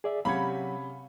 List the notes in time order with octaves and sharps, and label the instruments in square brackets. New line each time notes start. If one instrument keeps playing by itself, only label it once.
[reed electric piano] G#4 D5 E5
[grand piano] C3 C#4 G#6 [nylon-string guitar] F#3 G4 F#5 [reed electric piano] F5 [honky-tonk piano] B5